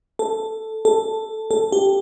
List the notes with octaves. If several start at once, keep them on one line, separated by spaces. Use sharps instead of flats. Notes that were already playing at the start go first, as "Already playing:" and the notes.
A4
A4
A4
G4